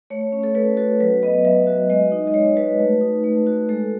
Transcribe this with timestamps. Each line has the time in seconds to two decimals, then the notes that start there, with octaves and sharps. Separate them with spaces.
0.10 A3 C#5
0.32 C#4
0.43 A4
0.55 A3 B4
0.77 F#4 A4
1.00 F#3 B4
1.23 B3 D#5
1.44 F#3 E5
1.67 F#4
1.90 G#3 D#5
2.12 D#4
2.27 D#5
2.34 G#3 C#5
2.57 F#4 B4
2.80 A3
3.01 D#4
3.24 A3
3.47 F#4
3.69 G#3 A4